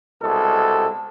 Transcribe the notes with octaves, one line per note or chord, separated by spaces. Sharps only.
C2 B2 G#3 A4